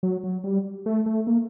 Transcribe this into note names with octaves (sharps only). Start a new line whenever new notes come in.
F#3
F#3
G3
A3
A3
A#3